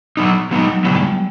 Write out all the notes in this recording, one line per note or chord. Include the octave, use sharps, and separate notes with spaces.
F#3 B3 D#4
F#3 G#3 B3 D#4
G3
F#3
C#3 F#3 G3 B3 E4
G#3
G3